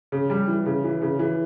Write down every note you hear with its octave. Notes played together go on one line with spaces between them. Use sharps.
C#3
G3
E3
C#3
E3
C#3
E3